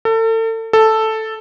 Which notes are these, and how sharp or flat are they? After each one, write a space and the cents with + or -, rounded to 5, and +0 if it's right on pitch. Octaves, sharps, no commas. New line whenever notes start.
A4 +35
A4 +0